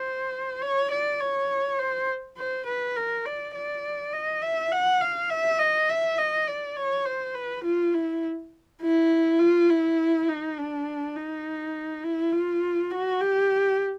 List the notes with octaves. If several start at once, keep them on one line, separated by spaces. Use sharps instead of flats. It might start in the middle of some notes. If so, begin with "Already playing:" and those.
Already playing: C5
C#5
D5
C#5
C5
C5
B4
A#4
D5
D5
D#5
E5
F#5
F5
E5
D#5
E5
D#5
D5
C#5
C5
B4
F4
E4
E4
F4
E4
D#4
D4
D#4
E4
F4
F#4
G4